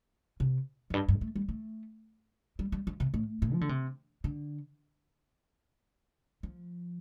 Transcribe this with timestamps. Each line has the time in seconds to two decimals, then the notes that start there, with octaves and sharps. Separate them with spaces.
0.40 C3
0.90 F2
0.94 G2
1.08 G2
1.21 A3
1.36 G3
1.49 A3
2.59 G3
2.72 G3
2.87 F3
3.00 C3
3.14 A2
3.42 A2
3.53 F3
3.61 D3
3.69 C3
4.24 D3
6.43 F3